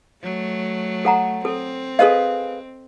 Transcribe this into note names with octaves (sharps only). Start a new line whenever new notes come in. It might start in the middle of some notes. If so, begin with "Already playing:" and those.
F#3 A3
A4 F#5 A#5
C4 A4
G#4 A4 B4 D#5 F5